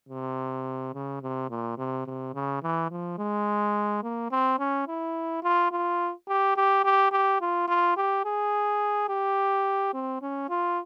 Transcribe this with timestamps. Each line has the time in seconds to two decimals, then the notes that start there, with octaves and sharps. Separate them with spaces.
0.09 C3
0.94 C#3
1.22 C3
1.50 A#2
1.78 C3
2.06 C3
2.34 C#3
2.62 E3
2.90 F3
3.18 G#3
4.03 A#3
4.31 C4
4.59 C#4
4.88 E4
5.43 F4
5.71 F4
6.28 G4
6.56 G4
6.84 G4
7.12 G4
7.41 F4
7.68 F4
7.97 G4
8.25 G#4
9.09 G4
9.93 C4
10.22 C#4
10.50 F4